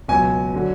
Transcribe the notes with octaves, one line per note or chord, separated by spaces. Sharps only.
C#2 B2 F#3 G#5
D3 F#3